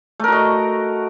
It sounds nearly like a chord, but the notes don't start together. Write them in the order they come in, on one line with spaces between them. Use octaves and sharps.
A3 A#4 F#4 D#5